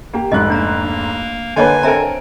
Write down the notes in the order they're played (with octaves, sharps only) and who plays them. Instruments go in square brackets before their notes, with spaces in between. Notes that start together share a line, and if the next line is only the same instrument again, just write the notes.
[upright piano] A#3 G4
[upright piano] F1 G#2 F#6 [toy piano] D#5
[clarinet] A#3 [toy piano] D4 A#5
[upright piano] D3 A#3 B4 [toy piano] C#5 D#5 A5 [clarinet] G#5
[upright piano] C4 A4 A#4 [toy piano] E5 A#5